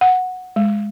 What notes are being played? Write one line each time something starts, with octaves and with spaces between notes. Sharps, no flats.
F#5
G#3